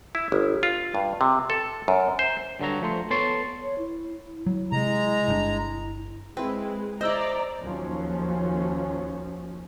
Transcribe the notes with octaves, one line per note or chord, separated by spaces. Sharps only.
E4
G1
F4
G2
C3
A4
F#2
C5
G2 D3 F#3 A#5
F3 A3 C5
B3 A4 C#5 D5 A5 C6
C#5
E4
F#3
C3 G#3 A#5
G1 C#3 D4
G#3 C4 E4 B4
E4 C5 D5 D#5 A#5 E6
D#2 F3 F#3 C#4